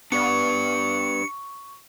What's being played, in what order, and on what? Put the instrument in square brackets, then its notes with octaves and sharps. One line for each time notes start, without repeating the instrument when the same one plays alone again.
[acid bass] B3 [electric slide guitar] D4 G4 D5 [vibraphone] C#6 [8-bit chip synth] C#7